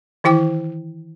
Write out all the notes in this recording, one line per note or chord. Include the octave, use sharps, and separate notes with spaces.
D#3 E3 E4 G5 D6